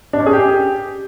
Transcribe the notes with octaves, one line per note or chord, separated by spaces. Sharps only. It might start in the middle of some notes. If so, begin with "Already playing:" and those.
D4
C#4
G#4
G4